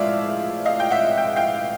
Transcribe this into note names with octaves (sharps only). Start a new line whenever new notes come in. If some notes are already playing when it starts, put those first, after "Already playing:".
Already playing: A2 F3 G#3 D5 E5 F5
D#5 F5
G5
E5 F#5
G5
F5 G5